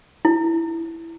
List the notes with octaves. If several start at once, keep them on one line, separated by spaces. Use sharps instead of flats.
E4